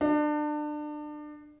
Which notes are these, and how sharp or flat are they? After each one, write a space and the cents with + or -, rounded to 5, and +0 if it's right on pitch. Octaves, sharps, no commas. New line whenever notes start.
D4 +30